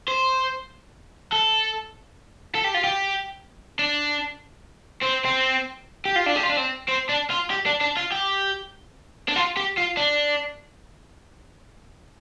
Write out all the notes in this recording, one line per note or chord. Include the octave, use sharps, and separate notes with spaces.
C5
A4
A4
G4
F4
G4
D4
C4
C4
G4
F4
D4
G4
F4
D4
C4
C4
D4
F4
G4
D4
D4
F4
G4
D4
F4
G4
F4
D4